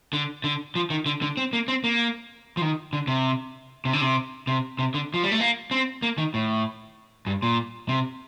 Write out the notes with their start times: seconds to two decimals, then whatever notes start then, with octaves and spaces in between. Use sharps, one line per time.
0.13 D3
0.44 D3
0.75 F3
0.90 D#3
1.06 D3
1.22 D3
1.37 C4
1.53 A#3
1.68 C4
1.84 A#3
2.57 F3
2.61 D#3
2.93 D3
3.07 C3
3.85 C3
3.93 D3
4.01 C3
4.47 C3
4.79 C3
4.94 D3
5.14 F3
5.23 G3
5.32 A3
5.40 A#3
5.71 C4
6.02 A#3
6.18 D#3
6.34 A2
7.27 G2
7.42 A#2
7.89 C3